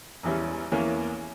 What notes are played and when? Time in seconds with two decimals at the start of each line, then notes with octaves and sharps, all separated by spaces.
0.23 E1 E2 E3 G3 C#4
0.72 E2 E3 A#3 C#4